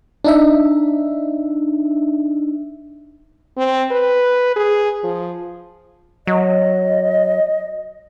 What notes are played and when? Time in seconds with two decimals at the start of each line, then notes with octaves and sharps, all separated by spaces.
0.24 D4 D#4 E5
3.57 C4
3.91 B4
4.56 G#4
5.03 F3
6.27 F#3 D#5